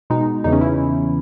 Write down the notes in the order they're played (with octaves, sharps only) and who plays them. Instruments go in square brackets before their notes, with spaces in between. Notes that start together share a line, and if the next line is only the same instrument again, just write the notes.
[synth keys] B2 G#3 D#4
E2 C#3 E3 D#4
C#4
E4